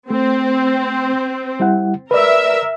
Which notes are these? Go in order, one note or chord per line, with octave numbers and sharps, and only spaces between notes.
A3 C4
G3 E4 F#5
A#4 B4 D5 E5